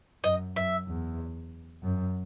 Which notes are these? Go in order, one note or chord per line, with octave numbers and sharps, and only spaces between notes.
F#2 D#5
F#2 E5
E2
F#2